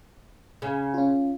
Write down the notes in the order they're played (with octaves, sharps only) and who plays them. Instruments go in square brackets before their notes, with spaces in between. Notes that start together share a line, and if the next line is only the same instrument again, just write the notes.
[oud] C#3
[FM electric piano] C#4 F4